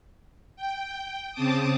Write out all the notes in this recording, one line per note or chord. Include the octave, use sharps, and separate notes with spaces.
G5
C#3 C4 A5 D6 D#6